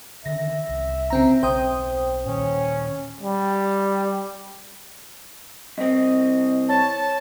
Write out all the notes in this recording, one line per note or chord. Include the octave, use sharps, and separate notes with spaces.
D3 D#3 C#4 E5 A#6
C2
C#3 C4 A#5
B1 C4 C5 G5 D#6
A#2 D#3 C#4
G3
C2 C4 D#5
C#5 A5